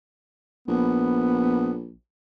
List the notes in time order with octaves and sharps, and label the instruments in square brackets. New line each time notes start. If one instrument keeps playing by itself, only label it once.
[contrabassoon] A#1 [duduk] B3